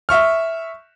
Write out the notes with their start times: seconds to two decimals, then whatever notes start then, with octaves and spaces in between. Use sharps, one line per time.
0.09 E5 C#6 F6